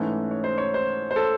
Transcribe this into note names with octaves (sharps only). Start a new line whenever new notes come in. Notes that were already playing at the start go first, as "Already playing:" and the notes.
Already playing: G#2 E3 A3 C#4
C#5
C5
C#5
C5
C5
A4